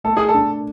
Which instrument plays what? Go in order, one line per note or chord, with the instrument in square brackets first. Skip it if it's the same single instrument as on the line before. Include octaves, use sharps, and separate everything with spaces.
[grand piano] A3 [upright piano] A4
[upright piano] G#4
A4
[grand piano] D4